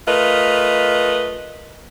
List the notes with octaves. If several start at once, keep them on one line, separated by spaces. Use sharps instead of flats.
A3 F4 A#4 B4 D#5